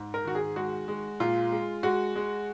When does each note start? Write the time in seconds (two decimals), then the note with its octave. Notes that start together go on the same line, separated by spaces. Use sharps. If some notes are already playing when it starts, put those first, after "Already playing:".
Already playing: G#2
0.14 A#4
0.25 D#3 F#4
0.35 G#4
0.56 G#3 F#4
0.88 G#3
1.20 A#2 F4
1.52 G#3
1.83 G#3 F#4
2.15 G#3